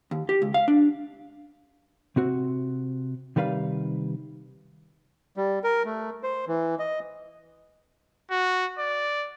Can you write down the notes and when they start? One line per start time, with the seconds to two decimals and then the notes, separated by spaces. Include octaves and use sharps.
0.11 D#2
0.29 G4
0.42 C#2
0.54 F5
0.68 D4
2.16 C3 C4 F#4
3.36 C3 D#3 G3 B4 F5
5.37 G3
5.64 A#4
5.85 A3
6.23 C5
6.47 E3
6.79 D#5
8.31 F#4
8.79 D5